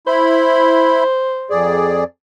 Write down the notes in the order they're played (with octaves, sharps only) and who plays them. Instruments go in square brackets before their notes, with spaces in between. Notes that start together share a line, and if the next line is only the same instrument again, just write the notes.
[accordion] E4 B5 [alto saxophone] C5
[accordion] F2 G#4 D5